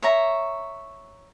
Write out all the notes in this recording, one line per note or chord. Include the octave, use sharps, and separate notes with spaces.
C#5 E5 A#5